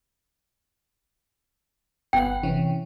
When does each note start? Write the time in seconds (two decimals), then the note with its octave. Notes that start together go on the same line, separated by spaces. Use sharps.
2.13 G1 B3 F#5 G5
2.43 C3 E3 C#4